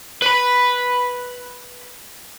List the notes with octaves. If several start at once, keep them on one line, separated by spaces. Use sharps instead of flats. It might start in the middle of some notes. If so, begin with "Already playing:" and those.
B4 B5